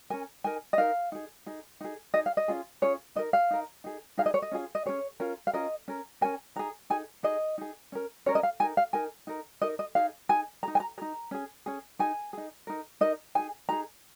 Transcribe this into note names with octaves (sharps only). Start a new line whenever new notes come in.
C#4 A#4 G#5
D#4 A#4 G#5
D#5
D#4 A#4 F5
D#4 G#4
D#4 G#4
D#4 G#4
D#4 G#4 D#5
F5
D#5
C#4 F4 G#4
C#4 F4 G#4 C#5
D#4 A#4 D#5
F5
D#4 A#4
D#4 G#4
D#4 G#4 F5
D#5
C#5
D#5
C#4 F4 G#4
D#5
C#4 F4 G#4 C#5
C#4 F4 A#4
F5
C#4 F4 A#4 D#5
C#4 A#4
C#4 A#4 G#5
D#4 G#4 A#5
D#4 G#4 G#5
D#4 G#4 D#5
D#4 G#4
C#4 A#4
C#4 A#4 C#5
D#5
F5
D#4 A#4 G#5
F5
D#4 A#4 G#5
D#4 A#4
D#4 A#4 D#5
D#5
D#4 G#4 F5
D#4 G#4 G#5
G#4 A#5
D#4
G#5
A#5
D#4 G#4 A#5
C#4 G#4
C#4 G#4
D#4 G#4 G#5
D#4 G#4
D#4 A#4
D#4 A#4 D#5
D#4 G#4 G#5
D#4 G#4 A#5